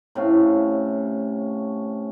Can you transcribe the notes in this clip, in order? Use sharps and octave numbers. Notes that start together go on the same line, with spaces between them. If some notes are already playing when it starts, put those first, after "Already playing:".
A2 C3 C#4 F5